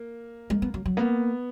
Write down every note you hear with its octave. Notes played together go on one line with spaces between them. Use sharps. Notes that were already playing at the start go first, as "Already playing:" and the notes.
Already playing: A#3
G#3
B3
F#3
F#3
A#3 B3